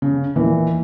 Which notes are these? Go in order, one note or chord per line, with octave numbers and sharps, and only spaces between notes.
C#3
A#2 D#3 E3